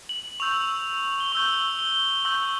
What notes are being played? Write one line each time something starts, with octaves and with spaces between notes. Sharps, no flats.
F#7
C#6 E6 G6 F7
G7
C#6 E6 G6 F#7
G7
C#6 E6 G6 F#7